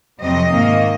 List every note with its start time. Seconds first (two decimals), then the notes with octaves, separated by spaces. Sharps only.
0.21 F2 C3 F#3 C4 D#5
0.51 G#2 D#3 A#3